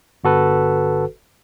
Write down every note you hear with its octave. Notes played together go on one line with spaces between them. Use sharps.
G1 F#4 A4 B4